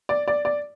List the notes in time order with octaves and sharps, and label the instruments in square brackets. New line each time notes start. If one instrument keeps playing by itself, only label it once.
[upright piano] D5
D5
D5